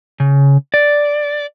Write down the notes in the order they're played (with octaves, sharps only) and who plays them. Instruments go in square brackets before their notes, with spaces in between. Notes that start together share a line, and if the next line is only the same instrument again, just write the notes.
[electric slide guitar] C#3
D5